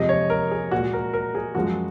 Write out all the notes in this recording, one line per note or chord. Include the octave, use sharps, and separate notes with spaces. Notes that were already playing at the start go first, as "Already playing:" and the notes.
Already playing: F2 C3 F3 G#3 D#5
C#5
A#4
G#4
A#2 G#3 F#4
A#4
A#4
G#4
F#2 F3 G#3 F#4